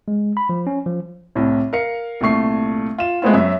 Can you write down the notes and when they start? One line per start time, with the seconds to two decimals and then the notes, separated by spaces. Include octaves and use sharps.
0.08 G#3
0.37 B5
0.49 F3
0.67 C#4
0.86 F3
1.35 C2 A2
1.73 A#4 F5 C#7
2.21 C2 A#2 A3 C#6 C7
2.98 F4 E7
3.22 G#3 A3 B3 C4 E4 F4
3.34 F#2 E5